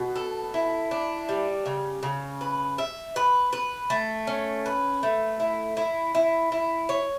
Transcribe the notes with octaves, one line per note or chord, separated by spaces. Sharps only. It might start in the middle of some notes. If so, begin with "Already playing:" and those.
Already playing: B2
A4
E4
D4
G3
C#3
C#3
B4
E5
B4
B4
A3
C#4
B4
A3
E4
E4
E4
E4
C#5